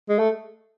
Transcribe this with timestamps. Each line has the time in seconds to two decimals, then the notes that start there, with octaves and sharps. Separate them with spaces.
0.09 G#3
0.19 A3